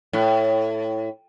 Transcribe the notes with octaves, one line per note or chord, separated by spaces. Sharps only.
A2